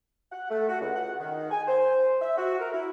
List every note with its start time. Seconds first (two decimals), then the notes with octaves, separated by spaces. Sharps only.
0.32 F#5
0.50 A3
0.69 F#4
0.81 C#2
0.95 F#5
1.20 D#3
1.51 G#5
1.68 C5
2.21 E5
2.38 F#4
2.60 A#4
2.73 E4